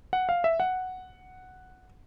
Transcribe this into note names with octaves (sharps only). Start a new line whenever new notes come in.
F#5
F5
E5
F#5